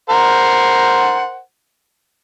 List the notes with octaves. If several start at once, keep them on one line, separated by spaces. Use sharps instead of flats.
A#4 C5 F#5